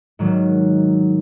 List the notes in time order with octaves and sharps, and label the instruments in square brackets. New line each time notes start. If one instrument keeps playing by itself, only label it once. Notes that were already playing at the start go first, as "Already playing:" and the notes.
[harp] G#2 D#3 F#3